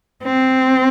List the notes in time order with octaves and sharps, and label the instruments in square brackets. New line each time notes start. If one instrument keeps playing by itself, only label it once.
[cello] C4